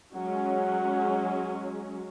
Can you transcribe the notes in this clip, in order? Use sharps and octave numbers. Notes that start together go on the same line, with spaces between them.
F#3 G#3 C#4 F#5